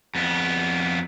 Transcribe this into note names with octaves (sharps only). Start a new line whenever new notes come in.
F2 B3